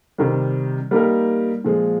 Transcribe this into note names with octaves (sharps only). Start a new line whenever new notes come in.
C3 D#3 G3
G3 A#3 D#4 G4 A#4
A#2 F3 G#3